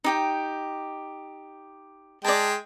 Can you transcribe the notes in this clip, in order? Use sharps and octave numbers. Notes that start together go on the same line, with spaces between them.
D#4 G4 G5
G#3 D5 G5 A5